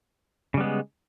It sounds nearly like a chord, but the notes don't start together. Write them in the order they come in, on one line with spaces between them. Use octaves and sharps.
C#3 G3 B3 G#3